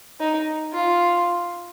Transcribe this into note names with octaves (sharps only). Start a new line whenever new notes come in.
D#4
F4